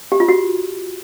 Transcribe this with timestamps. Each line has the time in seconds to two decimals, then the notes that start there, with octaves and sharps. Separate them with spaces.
0.12 G4
0.20 F4
0.28 F#4